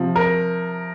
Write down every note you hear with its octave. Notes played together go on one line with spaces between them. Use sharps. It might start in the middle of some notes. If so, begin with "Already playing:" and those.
Already playing: C3 F3
A#4